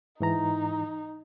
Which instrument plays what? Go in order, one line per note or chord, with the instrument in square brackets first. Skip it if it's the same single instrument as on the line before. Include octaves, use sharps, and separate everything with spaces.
[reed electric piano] G#2 E3 A#5 [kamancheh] D#4